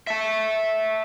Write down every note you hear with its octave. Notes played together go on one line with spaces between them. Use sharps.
E5 A5